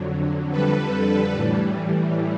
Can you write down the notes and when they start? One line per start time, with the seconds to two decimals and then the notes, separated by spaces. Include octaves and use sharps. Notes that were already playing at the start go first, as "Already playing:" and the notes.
Already playing: F2 D3 F#3
0.50 F2 D3 G3 A4 B4
0.92 A4 B4
1.34 A2 E3 G3